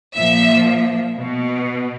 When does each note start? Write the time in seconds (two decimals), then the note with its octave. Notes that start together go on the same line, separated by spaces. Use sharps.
0.16 A#2 F3 E5
1.17 B2